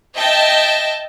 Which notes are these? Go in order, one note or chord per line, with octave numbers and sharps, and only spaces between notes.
D#5 E5 G5 A5